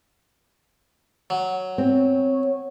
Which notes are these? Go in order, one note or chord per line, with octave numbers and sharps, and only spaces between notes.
F#3
C4 C#5